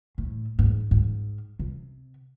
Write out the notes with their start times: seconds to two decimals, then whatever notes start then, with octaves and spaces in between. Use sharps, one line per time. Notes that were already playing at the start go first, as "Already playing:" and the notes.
0.18 A2
0.59 G#2
0.91 G#2
1.59 C3